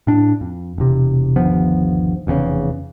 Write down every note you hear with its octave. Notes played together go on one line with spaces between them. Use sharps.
A2 D4
F2
E1 C3
G1 D#2 F3 B3
F1 E2 A#2 C#3